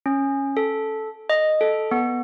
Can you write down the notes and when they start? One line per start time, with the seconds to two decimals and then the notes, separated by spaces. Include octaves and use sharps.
0.06 C#4
0.57 A4
1.30 D#5
1.61 A4
1.91 B3